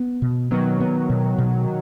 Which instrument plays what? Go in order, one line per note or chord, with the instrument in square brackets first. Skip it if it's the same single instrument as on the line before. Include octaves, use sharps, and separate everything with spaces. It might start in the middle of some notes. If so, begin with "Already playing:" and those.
Already playing: [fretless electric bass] B3
B2
[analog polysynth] D#3 F#3 [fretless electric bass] B3
[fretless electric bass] B3
B2
B2